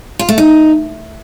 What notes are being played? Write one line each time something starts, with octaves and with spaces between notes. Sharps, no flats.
F4
A3
D#4